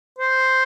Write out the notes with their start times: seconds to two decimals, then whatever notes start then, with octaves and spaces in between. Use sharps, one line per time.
0.19 C5